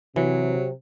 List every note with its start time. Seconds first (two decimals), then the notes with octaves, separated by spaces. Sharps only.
0.16 C3 E3 F#3